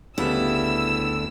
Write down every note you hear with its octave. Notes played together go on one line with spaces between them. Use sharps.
D2 C#3 G3 B3 E4 E6